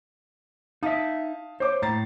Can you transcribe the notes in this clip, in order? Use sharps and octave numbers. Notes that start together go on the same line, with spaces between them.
D#4 E5 F5 A5 D#6
C5 C#5 D6
A2 A#5 A6 C7